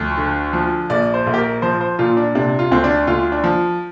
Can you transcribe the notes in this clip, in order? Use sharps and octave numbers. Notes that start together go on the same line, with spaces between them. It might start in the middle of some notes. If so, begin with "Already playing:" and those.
Already playing: D2 F3
D3
F3
A#1 D5
C5
A#1
G4
A#4
F3 C5
C5
A#2 F4
D4
C3 D4
F4
D2 C4
D4
D2 F4
D4
F3